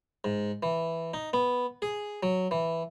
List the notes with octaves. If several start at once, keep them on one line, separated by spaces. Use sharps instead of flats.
G#2
E3
D#4
B3
G#4
F#3
E3